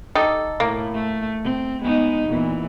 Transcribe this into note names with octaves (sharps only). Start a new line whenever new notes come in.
D#4 G4 A4
A2 A#3
A3
C4
G#3 B3 D#4
E2 A#2 E3